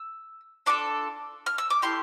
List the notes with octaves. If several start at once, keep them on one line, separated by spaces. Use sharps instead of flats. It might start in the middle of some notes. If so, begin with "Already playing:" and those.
Already playing: E6
D4 F4 A4 D6
F6
E6
D6
A3 E4 G4 C6